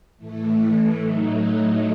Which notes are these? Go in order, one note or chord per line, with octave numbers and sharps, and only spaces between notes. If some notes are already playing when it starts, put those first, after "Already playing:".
A2 E3 A3
A2 F#3 A3 D#4